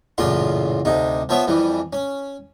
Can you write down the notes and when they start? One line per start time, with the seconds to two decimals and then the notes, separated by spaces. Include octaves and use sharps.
0.18 A1 F#2 A#2 C#3 F4 C6
0.85 D2 C3 D#4
1.29 F3 B3 C#5 E5
1.47 F2 E3 G3
1.93 C#4